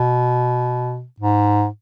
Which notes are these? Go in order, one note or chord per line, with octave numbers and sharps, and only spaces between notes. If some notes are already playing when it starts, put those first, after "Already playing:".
Already playing: B2
G#2